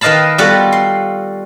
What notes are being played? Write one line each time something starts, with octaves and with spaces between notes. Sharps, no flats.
D#3 B4 D#5 F5 A5 B5
G3 B3 F4 F#4 A4 F#5
C6